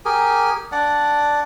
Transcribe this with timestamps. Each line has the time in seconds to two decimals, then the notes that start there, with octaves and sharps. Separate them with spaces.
0.05 G4 G#4 A#4 G#5
0.72 D4 D5 F#5